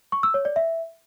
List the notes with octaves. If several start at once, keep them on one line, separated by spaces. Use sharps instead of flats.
C#6
E6
C#5
D5
E5